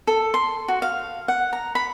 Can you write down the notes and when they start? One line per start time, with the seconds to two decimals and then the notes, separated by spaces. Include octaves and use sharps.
0.07 A4
0.34 C6
0.68 F#4
0.82 F5
1.28 F#5
1.53 A#5
1.75 B5